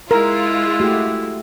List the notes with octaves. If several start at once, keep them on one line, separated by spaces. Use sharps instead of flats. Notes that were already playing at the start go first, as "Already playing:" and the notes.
G#3 E4 F4 A#4
A3 F#4 G4